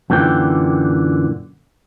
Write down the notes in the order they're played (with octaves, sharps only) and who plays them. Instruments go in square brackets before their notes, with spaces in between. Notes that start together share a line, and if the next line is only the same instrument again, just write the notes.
[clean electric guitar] F#2 A#2 D3 E3 G5